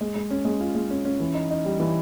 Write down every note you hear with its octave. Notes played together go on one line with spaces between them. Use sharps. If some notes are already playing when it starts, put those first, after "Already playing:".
G#3
G#3
C#4
G#3
F4
G#3
C#4
C#4
E3
D#4
D#4
G3
E3